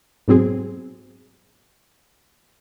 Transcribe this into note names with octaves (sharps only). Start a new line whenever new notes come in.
G#2 B2 F#3 C4 G#4